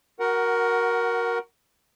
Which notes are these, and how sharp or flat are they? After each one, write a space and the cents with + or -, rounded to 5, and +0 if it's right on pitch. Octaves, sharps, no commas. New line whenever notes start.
F#4 +0 A#4 +10 F#5 +20